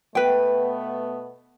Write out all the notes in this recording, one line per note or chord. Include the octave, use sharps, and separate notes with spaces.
B2 A3 B3 B4 G5